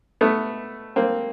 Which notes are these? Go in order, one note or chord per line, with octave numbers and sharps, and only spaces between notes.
A3 B3
A#3 C4